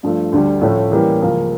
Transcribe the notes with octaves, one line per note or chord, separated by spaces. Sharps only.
G2 F3 A3
D2 D3 G3
A2 F3 A3 C#4
E3 G3 A#3 C#4 G4
C#2 C#3 F3 A#3